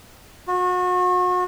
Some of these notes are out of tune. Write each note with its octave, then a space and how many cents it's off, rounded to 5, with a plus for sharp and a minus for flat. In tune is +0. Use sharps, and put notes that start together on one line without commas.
F#4 -35